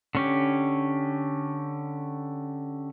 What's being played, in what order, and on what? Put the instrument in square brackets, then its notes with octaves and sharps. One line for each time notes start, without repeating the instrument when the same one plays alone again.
[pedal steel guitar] D3 C#4 G4